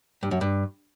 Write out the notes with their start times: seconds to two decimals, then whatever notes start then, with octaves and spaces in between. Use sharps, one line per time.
0.23 G2
0.31 F#2
0.41 G2